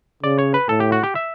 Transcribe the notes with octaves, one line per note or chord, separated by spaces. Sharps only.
C#3 D5
C#5
B4
A2 A4
G4
F#4
G4
E5